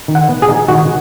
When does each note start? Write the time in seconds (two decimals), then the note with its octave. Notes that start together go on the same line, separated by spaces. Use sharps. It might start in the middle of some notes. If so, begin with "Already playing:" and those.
0.08 D#3
0.15 F#5
0.29 B3
0.42 G#4
0.49 D#4
0.68 D#3 F#4